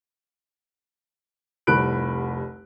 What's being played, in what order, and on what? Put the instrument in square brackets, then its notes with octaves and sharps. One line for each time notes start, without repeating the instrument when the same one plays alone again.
[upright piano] F1 C2 B5 F#6 D7